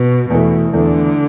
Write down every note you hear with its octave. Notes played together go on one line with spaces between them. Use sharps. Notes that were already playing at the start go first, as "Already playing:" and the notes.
Already playing: B2
E2 B2 E3 A3
E2 D3 E3 A3